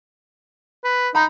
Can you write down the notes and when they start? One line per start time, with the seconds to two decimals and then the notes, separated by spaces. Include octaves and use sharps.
0.84 B4
1.15 D#4 A#5 B5